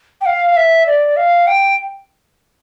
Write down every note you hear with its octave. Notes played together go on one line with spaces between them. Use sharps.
G5
F5
F5
E5
D5
F5
G5